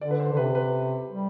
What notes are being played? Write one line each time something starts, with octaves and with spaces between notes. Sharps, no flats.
D3 D5
B4
C5
D3
C3 B4
B4
G3